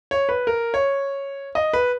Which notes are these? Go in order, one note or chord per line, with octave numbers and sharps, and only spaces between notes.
C#5
B4
A#4
C#5
D#5
B4